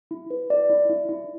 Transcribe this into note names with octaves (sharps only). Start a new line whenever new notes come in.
E4
B4
D5
E4
E4
E4